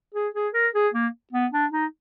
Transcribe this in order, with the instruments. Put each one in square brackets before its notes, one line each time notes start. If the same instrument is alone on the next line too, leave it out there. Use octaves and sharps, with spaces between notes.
[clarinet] G#4
G#4
A#4
G#4
A#3
B3
D4
D#4